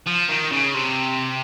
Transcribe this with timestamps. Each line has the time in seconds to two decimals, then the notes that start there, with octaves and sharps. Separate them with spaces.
0.07 F3
0.29 D#3
0.52 C#3
0.74 C3